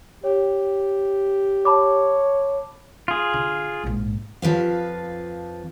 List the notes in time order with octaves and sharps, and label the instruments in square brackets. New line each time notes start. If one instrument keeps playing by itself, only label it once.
[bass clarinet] G4 [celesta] C#5
[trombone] C#5 [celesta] A5 B5 D6
[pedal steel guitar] F4 G#4
[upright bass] D3
A#1 G#2
[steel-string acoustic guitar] F2 F3 B4 F5